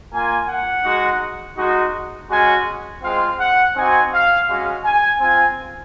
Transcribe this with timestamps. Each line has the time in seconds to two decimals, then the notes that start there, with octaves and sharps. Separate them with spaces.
0.12 A#3 F4 G#5
0.49 F#5
0.85 G#3 D#4 F#4
1.58 G#3 D#4 F#4
2.30 G#3 C#4 F#4 G#5
3.03 G#3 C4 F4 F5
3.40 F#5
3.75 C4 D#4 F#4 G#5
4.13 F5
4.48 G#3 C#4 F#4 F5
4.85 G#5
5.20 C4 F4 G#5